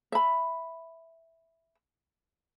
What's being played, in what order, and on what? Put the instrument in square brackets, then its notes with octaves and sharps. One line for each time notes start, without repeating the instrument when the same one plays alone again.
[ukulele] E5 B5